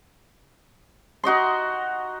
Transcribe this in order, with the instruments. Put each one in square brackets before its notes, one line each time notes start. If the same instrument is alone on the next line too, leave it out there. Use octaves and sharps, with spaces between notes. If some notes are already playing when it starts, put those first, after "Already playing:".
[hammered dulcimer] D#4 F#4 D#5 C6